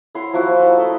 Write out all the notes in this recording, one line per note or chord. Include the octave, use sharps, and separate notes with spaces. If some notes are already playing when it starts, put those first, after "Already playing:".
E4 C#5 F#5 C6
F3 A#3 E4 F#4
D#5 E5 F#5 A5
A3 E4 D#5